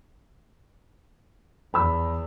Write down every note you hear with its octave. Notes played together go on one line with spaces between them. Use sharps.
E2 B5 E6